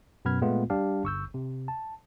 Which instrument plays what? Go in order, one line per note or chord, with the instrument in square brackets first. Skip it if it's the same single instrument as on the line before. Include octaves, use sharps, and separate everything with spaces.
[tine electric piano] F#2 B2 B3 B5 F6 G#6
A#2 G#3 A3 B3 F4
G3 D4 G4 F5 A5
G1 C#6 E6 G6
C3
A5